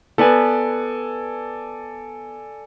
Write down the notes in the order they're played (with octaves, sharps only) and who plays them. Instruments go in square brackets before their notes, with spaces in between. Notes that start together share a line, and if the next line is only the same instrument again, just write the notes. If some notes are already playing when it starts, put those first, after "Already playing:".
[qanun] B3 B4 [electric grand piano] A4 D5 G#5